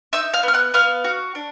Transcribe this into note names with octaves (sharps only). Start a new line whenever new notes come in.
D#4 E5 E6
F5 F6
B3
F6
F#5 F#6
B3 F5 F6
F#4
D4